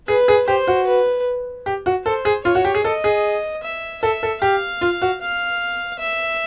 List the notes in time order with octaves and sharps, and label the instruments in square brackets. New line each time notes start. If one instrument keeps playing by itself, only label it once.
[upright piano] G#4 [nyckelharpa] B4
[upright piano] G#4
[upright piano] G4 [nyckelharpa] C5
[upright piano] F#4
[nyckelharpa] B4
[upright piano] G4
F#4
[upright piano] A4 [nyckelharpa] C5
[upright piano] G#4
[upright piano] F4 [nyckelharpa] C#5
[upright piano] F#4
G4
G#4
[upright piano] A4 [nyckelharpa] D#5
[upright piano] G#4
[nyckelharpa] E5
[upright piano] A4 [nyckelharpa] E5
[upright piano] A4
[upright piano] G4 [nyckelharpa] F5
[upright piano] F4
F#4
[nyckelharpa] F5
E5